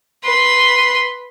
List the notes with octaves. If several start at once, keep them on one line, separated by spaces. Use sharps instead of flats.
B4 C6